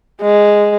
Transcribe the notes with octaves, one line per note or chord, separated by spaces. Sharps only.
G#3